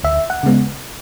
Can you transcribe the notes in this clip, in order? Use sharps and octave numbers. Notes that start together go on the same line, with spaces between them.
D2 E5
F#5
C#3 G#3 B3